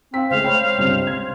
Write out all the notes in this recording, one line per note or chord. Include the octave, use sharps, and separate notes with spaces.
C4 F5 B6
C#2 G#3 A3 C5 F5
C#5 G5 B5
C#2 G2 C3
C6 G#6